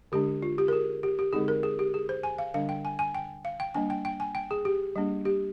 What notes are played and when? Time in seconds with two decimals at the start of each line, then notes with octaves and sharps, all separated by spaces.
0.12 D3 G#3 D4 G4
0.42 F4
0.58 G4
0.68 A#4
0.73 G#4
1.03 G4
1.19 G4
1.33 D3 G#3 C4 D#4 G#4
1.48 A#4
1.63 G#4
1.79 G4
1.94 G#4
2.09 C5
2.23 G#5
2.38 F5
2.54 D3 G3 D4 F5
2.69 G5
2.85 G#5
2.99 G#5
3.15 G5
3.45 F5
3.60 G5
3.75 G3 A#3 D4 G#5
3.90 G5
4.05 G5
4.20 G#5
4.35 G5
4.51 G#4
4.65 G4
4.96 G3 A#3 D4
5.25 G4